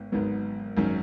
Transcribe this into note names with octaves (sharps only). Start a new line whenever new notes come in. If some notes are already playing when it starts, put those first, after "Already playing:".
Already playing: G#1 G#2 D#3 B3
G#1 G#2 D#3 F#3 B3
G#1 F#2 D#3 F#3 C#4